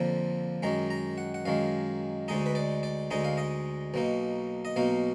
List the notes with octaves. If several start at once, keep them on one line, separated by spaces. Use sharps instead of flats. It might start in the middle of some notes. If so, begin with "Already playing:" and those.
Already playing: F2 D3 F3 A#3
F#2 D#3 G#3 A#5
A#5
F#5
F#5
F#2 D#3 G#3 F5
D2 D3 G#3 D#4 D#5
B4
D5
D5
D2 D3 G#3 D#4 D#5
F5
D#5
B1 B2 A#3 D#4
D#5
B1 B2 A#3 D#4 F5